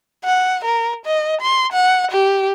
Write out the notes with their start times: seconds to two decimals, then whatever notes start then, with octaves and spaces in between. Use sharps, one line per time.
0.24 F#5
0.64 A#4
1.05 D#5
1.41 C6
1.72 F#5
2.11 G4